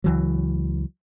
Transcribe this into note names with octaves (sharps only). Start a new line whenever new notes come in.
C#2 E3 F#3